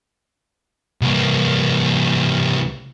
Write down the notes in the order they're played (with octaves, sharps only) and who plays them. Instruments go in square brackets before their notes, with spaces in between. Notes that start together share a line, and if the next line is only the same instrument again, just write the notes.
[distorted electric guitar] C2 A#3